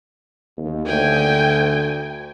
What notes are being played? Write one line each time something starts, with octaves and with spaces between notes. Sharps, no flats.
D#2
D2 G5 G#5